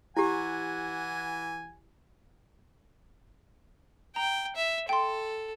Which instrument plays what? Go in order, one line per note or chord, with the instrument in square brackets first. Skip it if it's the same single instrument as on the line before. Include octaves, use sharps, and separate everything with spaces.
[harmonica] E3 F#5 G#5 [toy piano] E4 G4
[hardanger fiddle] G5 [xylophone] A#5
[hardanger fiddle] E5
[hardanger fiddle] A4 [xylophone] G5 C6